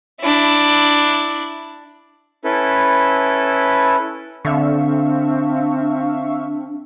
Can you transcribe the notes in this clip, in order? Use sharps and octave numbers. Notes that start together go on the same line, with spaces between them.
D4 E4
C#4 E4 A4 B4
D3 C4 D4 E5 F5 C#6